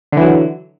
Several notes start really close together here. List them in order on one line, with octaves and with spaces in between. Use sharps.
D3 E3 F#3